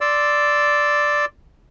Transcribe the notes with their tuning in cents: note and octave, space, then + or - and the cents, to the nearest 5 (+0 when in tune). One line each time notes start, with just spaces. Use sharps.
D5 +0 C6 +0 E6 +0